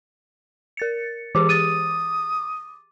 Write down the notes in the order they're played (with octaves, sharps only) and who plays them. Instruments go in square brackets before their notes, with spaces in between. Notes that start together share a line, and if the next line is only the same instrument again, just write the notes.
[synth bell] A#4 A6 C#7
[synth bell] E3 G4 G#4 [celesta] D6
[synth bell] D6 [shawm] D#6 [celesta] A6 D#7